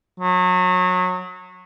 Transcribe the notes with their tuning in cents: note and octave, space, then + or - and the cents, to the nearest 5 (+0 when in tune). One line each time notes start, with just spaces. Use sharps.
F#3 -25